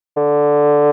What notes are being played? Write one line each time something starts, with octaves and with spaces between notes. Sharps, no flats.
D3